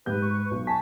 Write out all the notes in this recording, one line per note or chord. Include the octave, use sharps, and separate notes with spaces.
G#2 G4 B4 G6
C#6
B1
G#5 A5 B6